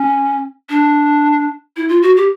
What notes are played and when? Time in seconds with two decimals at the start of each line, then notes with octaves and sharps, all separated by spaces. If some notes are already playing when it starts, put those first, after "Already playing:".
Already playing: C#4
0.70 D4
1.77 E4
1.89 F4
2.02 F#4
2.17 G4